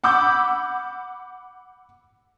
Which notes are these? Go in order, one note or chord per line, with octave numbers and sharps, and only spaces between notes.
F#5 B5 D6 E6 G6